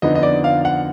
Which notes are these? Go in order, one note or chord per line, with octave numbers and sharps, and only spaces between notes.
F2 D3 F3 B3 D#4 D#5
D#5
D5
F5
F#5